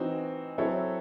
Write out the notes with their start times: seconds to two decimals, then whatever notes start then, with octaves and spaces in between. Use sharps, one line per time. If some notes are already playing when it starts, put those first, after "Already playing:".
Already playing: E3 C4 D#4 F#4
0.58 F#3 C4 E4 A4 C#5